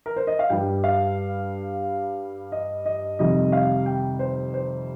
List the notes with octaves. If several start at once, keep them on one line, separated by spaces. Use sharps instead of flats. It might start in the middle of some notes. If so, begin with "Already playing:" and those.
A#4
C5
D#5
F5
G2 G3 G5
F5
D#5
D#5
F2 C3 D#3 G3 D#5
F5
G5
C5
C5